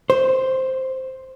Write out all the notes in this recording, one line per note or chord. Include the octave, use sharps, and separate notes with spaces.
C5